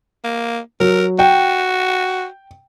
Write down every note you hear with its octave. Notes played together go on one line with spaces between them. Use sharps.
A#3
F#3 A#4
F#4 G5